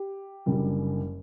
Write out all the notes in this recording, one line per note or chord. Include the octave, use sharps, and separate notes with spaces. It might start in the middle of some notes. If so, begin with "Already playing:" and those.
Already playing: G4
F#1 F#2 D3 G3